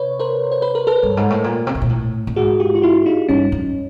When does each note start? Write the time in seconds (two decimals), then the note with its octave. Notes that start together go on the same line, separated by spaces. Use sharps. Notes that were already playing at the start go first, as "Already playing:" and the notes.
Already playing: C3 B4 C#5
0.19 A#4 C5
0.52 C5
0.62 B4
0.75 A#4
0.87 A4 B4
1.03 G2
1.17 G#2
1.30 A2
1.44 A#2
1.67 C3
1.75 B2
1.82 A#2
1.89 A2
2.27 A2
2.36 G#2 F#4 G#4
2.60 F4 G4
2.75 F4
2.82 E4 F#4
3.06 D#4 F4
3.29 G2 C#4 D#4
3.52 F#2